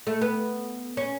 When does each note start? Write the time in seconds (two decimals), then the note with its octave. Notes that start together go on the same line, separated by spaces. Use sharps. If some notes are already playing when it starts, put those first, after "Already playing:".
0.07 A3
0.21 B3
0.97 C#4